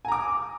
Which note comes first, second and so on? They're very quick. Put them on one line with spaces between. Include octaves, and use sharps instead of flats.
G#5 A#5 D6